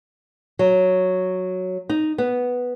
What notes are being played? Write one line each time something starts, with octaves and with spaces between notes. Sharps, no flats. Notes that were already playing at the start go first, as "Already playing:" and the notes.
F#3
D#4
B3